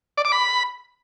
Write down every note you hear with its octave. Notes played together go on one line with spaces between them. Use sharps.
D5
D6
B5